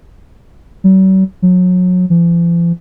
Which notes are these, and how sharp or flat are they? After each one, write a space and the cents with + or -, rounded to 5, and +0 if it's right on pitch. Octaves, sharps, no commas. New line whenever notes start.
F#3 +45
F#3 -30
F3 -45